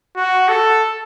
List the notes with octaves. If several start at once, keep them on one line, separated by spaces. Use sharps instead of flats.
F#4
A4